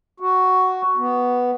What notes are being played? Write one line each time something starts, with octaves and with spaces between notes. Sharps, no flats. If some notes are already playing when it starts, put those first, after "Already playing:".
F#4
B3